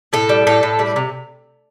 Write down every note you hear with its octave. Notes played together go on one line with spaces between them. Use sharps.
A2 A4
G3
A2 A4
A2
G3
C3